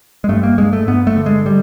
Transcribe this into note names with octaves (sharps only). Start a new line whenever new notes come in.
G#3
G2 A3
A#3
G2 G#3
A3
G2 B3
A3
D3
G#3
G3